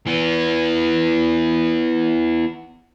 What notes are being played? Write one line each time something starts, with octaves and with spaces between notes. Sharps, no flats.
E3 B3